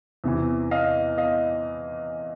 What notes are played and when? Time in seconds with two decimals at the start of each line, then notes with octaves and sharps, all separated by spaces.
0.24 E2 C3 E3
0.71 D#5 F5
1.18 D#5 F5